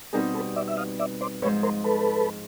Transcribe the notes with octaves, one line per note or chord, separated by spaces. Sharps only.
B2 G3 C4 D#4 G#4 A#4
A4 B4
D5 E5
E5
D#5 F5
D5 E5
C5 D5
G#2 F3 G#3 B4 C#5
A#4 C5
A4 B4